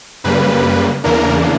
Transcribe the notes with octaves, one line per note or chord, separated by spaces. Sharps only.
F#2 C#3 G3 A#3 B4
E2 C#3 E3 A#3 D4 A#4